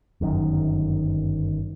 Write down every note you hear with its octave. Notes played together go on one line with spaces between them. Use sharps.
G1 F#2 D3 D#3